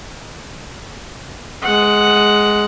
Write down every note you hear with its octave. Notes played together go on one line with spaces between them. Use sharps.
G#3 F#5